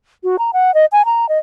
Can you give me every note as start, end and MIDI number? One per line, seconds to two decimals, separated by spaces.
0.24 0.36 66
0.39 0.51 82
0.53 0.74 78
0.74 0.86 75
0.92 1.05 80
1.05 1.28 82
1.29 1.38 75